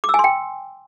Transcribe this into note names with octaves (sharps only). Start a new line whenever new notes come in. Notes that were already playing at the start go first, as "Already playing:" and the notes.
D6
E6
G#5
C6
G5